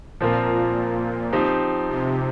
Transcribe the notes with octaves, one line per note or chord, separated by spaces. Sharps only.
A#2 F3 C4 F4 A#4
F3 C4 D#4 G4
C3